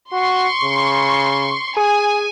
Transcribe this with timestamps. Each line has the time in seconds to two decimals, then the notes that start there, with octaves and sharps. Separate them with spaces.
0.12 F#4 C6 C#6
0.63 C#3
1.77 G#4 G#5